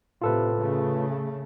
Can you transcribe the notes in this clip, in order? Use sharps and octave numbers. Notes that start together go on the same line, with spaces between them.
A2 C3 F4 A4 B4
C#3 A3